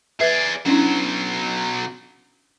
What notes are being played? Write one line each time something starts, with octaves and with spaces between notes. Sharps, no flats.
G#4 B4 D5 E5
B2 F#3 C#4 D4 E4